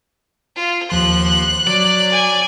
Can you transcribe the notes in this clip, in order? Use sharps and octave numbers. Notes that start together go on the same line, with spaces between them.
F4
D#2 F3 C6 F#6
F#3 D5
G#5